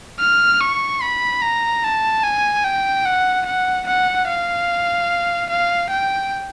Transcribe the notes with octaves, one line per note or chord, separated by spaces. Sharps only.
F6
C#6
B5
A#5
A5
G#5
G5
F#5
F#5
F#5
F5
F5
G5